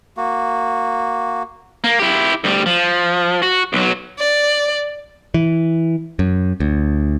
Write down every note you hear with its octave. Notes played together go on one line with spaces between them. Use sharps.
A#3 F#4
A#3
E4 G4
D2 G3
F3
F#4
B1 F#3
D5
E3
F#2
D2